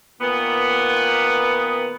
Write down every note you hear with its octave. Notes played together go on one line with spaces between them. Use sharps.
A#2 D#3 A#3 B3